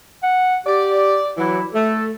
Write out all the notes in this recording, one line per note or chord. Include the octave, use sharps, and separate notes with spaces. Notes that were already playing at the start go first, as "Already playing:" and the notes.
F#5
G4 D5
E3 F#3 E4
A3 A4